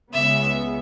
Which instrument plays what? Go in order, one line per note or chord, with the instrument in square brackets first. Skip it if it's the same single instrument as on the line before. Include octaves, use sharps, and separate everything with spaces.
[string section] C#2 C#3 G#3 B3 [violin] E5